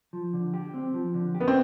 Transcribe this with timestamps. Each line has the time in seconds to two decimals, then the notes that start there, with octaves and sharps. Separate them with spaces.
0.13 F3
0.33 D3
0.54 G4
0.74 C4
0.94 F3
1.14 D3
1.35 G4
1.40 B3
1.48 C4